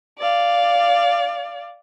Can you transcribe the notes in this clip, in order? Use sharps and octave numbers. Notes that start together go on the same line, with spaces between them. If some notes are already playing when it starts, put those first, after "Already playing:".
D5 F5